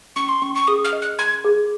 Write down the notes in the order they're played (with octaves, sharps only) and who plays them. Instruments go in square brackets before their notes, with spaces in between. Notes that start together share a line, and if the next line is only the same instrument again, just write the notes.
[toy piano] C#4 [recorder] C#6
[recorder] C6
[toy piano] C#4 [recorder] C#6
[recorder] C#6
[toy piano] G#4 [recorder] D#6
[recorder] F6
[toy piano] D#5
[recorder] F#6
[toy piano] C6 [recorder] G#6
[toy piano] G#4